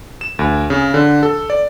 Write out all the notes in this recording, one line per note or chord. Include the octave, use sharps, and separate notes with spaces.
E7
D2
C#3
D3
A4
D5